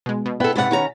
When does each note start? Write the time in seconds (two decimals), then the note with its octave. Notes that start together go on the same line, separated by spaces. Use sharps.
0.06 B2 G#3
0.26 B2
0.40 B3 E4 A4 B4 G5
0.56 G#2 C3 G4 B4 F#5 A6 B6
0.71 D#3 C#4 A#5